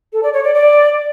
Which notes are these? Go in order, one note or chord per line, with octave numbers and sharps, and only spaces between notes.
A4
D5
C#5
D5
D5